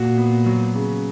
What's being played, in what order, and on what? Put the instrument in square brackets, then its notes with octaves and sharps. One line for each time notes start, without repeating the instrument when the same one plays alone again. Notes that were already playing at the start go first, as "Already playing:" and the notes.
Already playing: [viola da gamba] A#2 [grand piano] F#4
[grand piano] B3
F#3
C#3